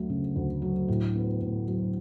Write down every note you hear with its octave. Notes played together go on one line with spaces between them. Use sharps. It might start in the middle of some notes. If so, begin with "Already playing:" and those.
Already playing: D2 F#3 A3
C#3
D2
F#3
A2
B3
A2
F#3